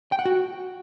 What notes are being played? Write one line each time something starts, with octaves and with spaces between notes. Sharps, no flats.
G5
F#5
F#4